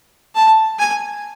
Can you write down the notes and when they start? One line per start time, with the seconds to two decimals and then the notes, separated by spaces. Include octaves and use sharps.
0.35 A5
0.79 G#5